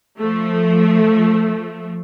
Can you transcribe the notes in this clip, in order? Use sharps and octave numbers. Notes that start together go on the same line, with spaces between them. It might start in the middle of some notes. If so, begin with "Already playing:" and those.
F3 A3